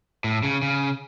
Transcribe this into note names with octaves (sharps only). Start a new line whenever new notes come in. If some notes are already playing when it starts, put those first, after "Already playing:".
A2
C#3
C#3